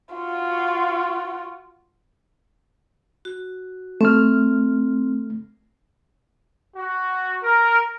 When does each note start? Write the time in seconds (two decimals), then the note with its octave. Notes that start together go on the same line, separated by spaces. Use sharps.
0.14 F4 F#4
3.25 F#4
4.01 A3 C4 F6
6.76 F#4
7.44 A#4